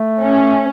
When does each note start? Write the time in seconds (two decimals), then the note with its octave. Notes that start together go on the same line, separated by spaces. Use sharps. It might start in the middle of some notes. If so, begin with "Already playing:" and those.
Already playing: A3
0.20 C#4